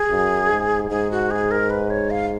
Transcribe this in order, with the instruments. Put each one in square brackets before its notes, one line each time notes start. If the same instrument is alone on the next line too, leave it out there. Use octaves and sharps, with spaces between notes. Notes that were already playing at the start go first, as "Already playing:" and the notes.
Already playing: [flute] G#4
[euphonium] F#2
G#2
[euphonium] G#2 [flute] G#4
[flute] F#4
G#4
A#4
B4
C#5
F5